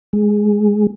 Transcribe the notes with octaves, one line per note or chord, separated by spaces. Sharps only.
G#3